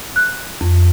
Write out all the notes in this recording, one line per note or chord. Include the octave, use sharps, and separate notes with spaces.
F#6
F2